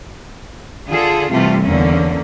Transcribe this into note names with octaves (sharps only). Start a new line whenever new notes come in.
D3 F4 G#4 A4
C3 E3 G3 A3 F4
E2 D3 A#3 C#4